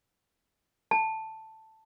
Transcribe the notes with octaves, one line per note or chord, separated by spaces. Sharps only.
A5